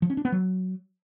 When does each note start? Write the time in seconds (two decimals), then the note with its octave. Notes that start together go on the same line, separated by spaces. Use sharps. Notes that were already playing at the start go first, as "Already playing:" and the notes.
0.02 F3
0.10 C#4
0.17 D4
0.25 B3
0.32 F#3